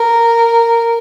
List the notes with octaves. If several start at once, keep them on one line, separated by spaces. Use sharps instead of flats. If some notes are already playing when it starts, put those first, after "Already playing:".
Already playing: A#4